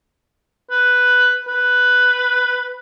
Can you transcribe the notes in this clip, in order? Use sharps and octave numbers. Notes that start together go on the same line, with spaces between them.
B4
B4